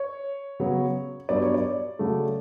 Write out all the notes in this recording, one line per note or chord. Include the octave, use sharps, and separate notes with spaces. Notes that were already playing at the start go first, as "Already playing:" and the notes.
Already playing: C#5
C#3 F#3 B3
G2 F#3 B3 D5
C#5
D5
C#3 F#3 A3